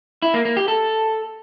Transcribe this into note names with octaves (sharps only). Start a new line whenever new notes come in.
E4
A#3
A#3
G4
A4